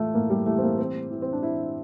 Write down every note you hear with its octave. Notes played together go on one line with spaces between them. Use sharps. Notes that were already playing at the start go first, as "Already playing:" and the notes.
Already playing: A2 E3 A3 F4
A2 A#3
G3
E3 A3
C4
A#3
E3 C4
E3
C4
D4
E3 E4